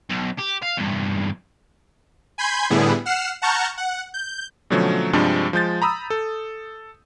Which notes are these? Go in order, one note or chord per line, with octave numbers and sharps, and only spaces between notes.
B1
G4
F5
E2 G2
G#5 B5 C6 G6 G#6
A2 D3 G3 B3 E4 G#4
F#5 F6 C7 E7
F#5 A5 A#5 C#6 F6 G6
F#5
G6
B2 D3 F3 F#3 A3 C#4
G2 C3 F3 G3 G#3 D4
F3 G#3 G6 A6
A#5 B5 D#6 E6
A4